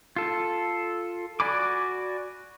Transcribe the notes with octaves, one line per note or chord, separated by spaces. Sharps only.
F4 A4
F#4 D5 G#5 B5 D6